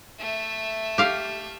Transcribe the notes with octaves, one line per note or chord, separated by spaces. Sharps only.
A3 E5
G4 F5